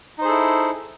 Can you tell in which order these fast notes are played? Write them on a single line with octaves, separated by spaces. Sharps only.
D#4 C5 G#4 A4 E4